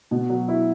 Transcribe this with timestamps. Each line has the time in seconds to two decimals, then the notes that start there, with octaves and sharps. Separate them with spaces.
0.11 B2
0.30 F#3
0.48 E4